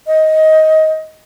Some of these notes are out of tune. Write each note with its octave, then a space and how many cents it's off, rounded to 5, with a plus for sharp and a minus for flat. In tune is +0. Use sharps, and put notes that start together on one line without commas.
D#5 +15